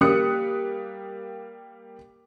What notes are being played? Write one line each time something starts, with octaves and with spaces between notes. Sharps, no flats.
G3 A#3 D#6 F#6 C#7